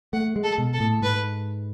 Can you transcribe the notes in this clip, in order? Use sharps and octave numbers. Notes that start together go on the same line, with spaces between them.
A3 F#5
G#3
A4
B2
A4
A2
G#2 B4